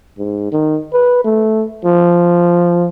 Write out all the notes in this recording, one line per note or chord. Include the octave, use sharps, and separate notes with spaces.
G#2
D#3
B4
A3
F3